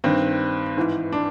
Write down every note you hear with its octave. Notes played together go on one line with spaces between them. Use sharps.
G2 D#3 C4
G#2 E3
D4